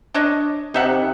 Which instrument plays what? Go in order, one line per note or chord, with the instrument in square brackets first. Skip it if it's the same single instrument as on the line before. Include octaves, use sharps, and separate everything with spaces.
[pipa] D4 C#5 D#5
[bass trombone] C3 [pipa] D#4 E5 F#5